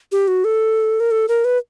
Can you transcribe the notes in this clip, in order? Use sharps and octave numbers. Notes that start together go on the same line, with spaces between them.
G4
F#4
A4
A#4
A4
A#4
B4